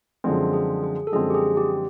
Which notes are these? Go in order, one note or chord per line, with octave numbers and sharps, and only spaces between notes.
F#2 D3 F3 G#3 C4 G#4
G#4
G#4
A4
F#2 D3 F3 G#3 C4 G#4
G4
G#4
G4